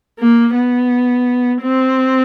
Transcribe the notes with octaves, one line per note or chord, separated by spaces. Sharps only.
A#3
B3
C4